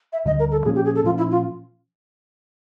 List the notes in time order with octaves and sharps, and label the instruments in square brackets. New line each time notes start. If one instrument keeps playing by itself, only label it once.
[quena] E5
[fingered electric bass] D2 D3 G3 [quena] D#5
[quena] A#4
A4
[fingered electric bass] A#2 F3 A#3 C#4 [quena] G#4
[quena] G4
G#4
A4
[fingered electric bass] A#2 F3 A#3 C#4 [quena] F4
[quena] E4
F4